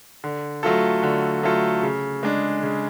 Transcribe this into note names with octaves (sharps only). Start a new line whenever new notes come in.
D3
F#3 A3 F4 A4
D3
F#3 A3 F4 A4
C#3
G#3 D4
C#3